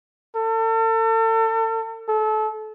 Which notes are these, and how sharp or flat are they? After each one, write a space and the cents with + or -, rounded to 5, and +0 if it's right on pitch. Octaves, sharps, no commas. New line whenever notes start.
A4 +35
A4 -30